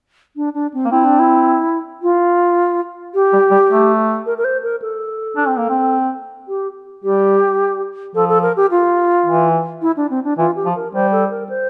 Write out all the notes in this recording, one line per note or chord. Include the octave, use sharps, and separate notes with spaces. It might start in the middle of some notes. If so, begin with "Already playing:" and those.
D4
D4
C4
A#3
C4 E4
D4
E4
F4
G4
G3
G3
A3
A#4
A#4
C5
A#4
A4
D4
C4
A#3
C4
G4
G3 G4
F3 A4
A4
A#4
G4
F4
E3
E4
D4
C4
D4
E3 F4
G4
F3
A#4
G3 C5
A4
A#4
C5